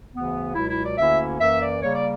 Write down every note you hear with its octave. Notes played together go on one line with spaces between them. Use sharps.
D2 C#3 E3 B3
C#2 B2 F#3 E4
E4
D5
D2 D3 A#3 C#4 E4 E5
F#2 E3 A#3 E5
D5
C#3 G3 A#3 C#5
D5